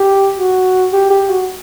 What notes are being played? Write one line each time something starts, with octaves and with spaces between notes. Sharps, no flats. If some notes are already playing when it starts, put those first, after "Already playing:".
Already playing: G4
F#4
G4
G4
F#4